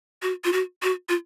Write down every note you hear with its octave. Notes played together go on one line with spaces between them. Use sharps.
F#4
F4
F#4
F#4
F4